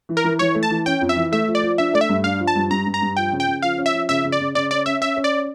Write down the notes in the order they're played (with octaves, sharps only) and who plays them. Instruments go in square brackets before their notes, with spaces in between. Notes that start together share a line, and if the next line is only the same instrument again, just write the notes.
[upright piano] E3
[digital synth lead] A#4
[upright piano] E3
[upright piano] E3 [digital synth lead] C#5
[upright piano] A3
[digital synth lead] A5
[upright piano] E3
[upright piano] C#4 [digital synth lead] G5
[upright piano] F2
[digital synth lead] E5
[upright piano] E3
[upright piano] A3 [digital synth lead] E5
[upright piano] F3
[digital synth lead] D5
[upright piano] F3
[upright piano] D4 [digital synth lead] E5
[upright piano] A3 [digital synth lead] D5
[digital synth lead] E5
[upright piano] G2
[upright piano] D4 [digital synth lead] F5
[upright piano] F3
[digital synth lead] A5
[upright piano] G2
[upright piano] G2 [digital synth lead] A#5
[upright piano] G2
[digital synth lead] A#5
[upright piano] G2
[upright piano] F3 [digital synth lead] G5
[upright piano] C#3
[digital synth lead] G5
[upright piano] C#3
[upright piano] F3 [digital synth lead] F5
[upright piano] C#4
[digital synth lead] E5
[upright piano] F3
[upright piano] C#3 [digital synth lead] E5
[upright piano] C#3
[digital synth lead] D5
[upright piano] C#3
[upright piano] C#3 [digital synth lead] D5
[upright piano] C#4 [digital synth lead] D5
[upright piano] C#4 [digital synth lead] E5
[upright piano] C#4 [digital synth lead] E5
[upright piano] C#4
[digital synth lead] D5